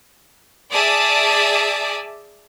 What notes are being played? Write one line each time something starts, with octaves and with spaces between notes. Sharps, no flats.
G#4 D5 E5 A5 D6 D#6